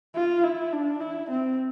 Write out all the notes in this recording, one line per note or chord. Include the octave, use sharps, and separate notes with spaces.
F4
E4
D4
E4
C4